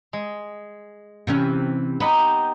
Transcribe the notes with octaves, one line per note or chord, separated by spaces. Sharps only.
G#3
C3 E3 C#4
B3 D#4 G4 B4